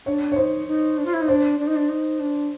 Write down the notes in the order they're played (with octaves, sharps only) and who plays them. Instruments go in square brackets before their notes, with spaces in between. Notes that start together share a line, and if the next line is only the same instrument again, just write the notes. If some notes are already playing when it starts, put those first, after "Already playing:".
[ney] D4 [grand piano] C#5
[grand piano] C#5
[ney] D#4 [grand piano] C5
[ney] D#4
D4
F4
E4
D#4
[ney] D4 [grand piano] C5
[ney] D4
D#4
D4
D#4
D4